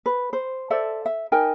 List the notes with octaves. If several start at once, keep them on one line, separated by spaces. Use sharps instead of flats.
B4
C5
A4 C5 D5 E5
E5
D#4 A#4 G5 G#5